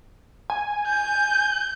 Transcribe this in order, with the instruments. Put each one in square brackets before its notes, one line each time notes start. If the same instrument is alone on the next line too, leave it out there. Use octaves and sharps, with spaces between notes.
[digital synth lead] G#5
[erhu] G6